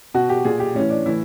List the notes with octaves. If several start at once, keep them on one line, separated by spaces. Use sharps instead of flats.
B2 F#4
G4
A#2 G#4
G4
A2 E3 C#4
D4
A2 E3 E4